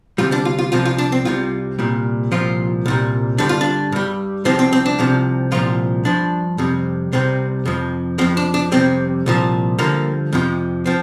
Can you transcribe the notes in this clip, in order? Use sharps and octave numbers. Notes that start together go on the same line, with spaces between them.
D2 C3 G3 F4
D4
F4
F4
C2 C3 F3 F4
F4
D4
C4
C2 C3 G3 F4
C2 A#2 G3
C2 A#2 F3 F4
C2 A#2 G3
G2 D3 G3 D4
F4
D4
G2 G3
C2 C3 F3 C4
C4
C4
D4
C2 C3 F3
C2 A#2 F3 F4
G2 F3 D4
F2 C3 G3
C2 C3 G3 C4
F2 C3 F3
F2 F3 C4
D4
D4
F2 C3 G3 C4
C2 A#2 F3
G2 D3 F3 A#3
F2 C3 F3
F3 C4